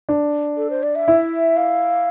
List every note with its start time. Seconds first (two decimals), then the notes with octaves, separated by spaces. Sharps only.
0.09 D4
0.57 A4
0.70 C5
0.83 D5
0.95 E5
1.08 E4
1.57 F5